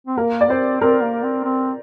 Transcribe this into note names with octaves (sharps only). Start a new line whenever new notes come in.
C4
A#3 A#4
D5
C4 C5
C4 A#4
A#3
C4
C4